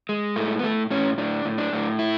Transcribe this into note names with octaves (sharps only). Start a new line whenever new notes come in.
G#3
A2 A3
B3
A2 A3
A2 C#4
A2 D4
A2
D4
A2
E4